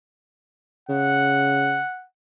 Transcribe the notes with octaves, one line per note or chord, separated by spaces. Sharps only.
C#3 F#5